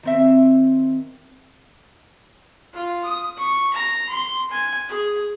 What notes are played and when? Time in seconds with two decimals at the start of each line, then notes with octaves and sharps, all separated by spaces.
0.03 D#3 C4 E5
2.73 F4
3.03 D#6
3.37 C#6
3.73 A#5
4.09 C6
4.51 G#5
4.89 G#4